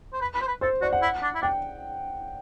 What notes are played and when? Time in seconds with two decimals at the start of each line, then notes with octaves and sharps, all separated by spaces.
0.13 C5
0.21 B4
0.35 B4
0.41 C5
0.48 B4
0.61 A4 C5
0.81 F#4 D5
0.93 F#5
1.02 E4
1.23 D4
1.35 E4
1.42 D4 G5